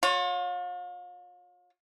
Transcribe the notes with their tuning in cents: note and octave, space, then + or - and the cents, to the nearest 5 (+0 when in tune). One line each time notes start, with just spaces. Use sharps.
F4 +40 C#5 +0